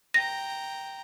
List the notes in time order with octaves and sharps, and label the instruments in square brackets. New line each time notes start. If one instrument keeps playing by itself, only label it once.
[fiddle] G5 A#5 [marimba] A#6